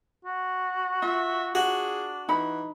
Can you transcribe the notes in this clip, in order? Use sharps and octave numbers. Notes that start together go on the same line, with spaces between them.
F#4
F4 E5
D4 F#4 G#4
E3 D#4 B5